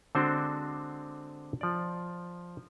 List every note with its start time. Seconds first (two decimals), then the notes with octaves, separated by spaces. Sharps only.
0.15 D3 G#3 C4 D4 F#4 C5
1.61 F3 D5